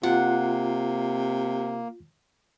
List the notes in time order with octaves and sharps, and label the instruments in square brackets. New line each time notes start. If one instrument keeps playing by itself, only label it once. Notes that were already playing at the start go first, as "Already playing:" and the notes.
[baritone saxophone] C3 [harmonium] A#3 [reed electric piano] F4 [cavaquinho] F#5